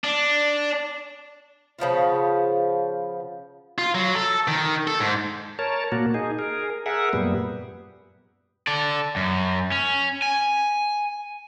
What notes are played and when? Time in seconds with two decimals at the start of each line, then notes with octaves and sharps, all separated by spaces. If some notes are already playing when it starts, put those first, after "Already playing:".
0.04 D4
1.79 C#3 F3 B3 F4
3.78 F4
3.95 F#3
4.15 A4
4.48 D#3
4.88 A4
5.00 G#2
5.59 A#4 C#5 A5
5.92 A#2 A#3 F#4
6.14 D#4 G#4
6.39 G#4 A#4
6.86 G#4 A#4 E5 F#5
7.13 F#2 A#2 G3 B3
8.67 A4 D5
9.16 F#2
9.72 C#4
10.22 G#5